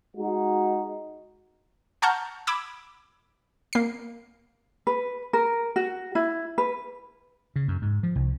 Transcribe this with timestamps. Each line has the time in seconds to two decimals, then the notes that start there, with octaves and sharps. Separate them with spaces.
0.17 G#3 D#4 F#4
2.02 F#5 A5 A#5 C#6 F6 G6
2.47 B5 D6 E6 G#6
3.73 A#3 C7
4.87 B4
5.33 A#4
5.76 F#4
6.15 E4
6.58 B4
7.56 C#3
7.68 F#2
7.82 G#2
8.03 F3
8.15 C2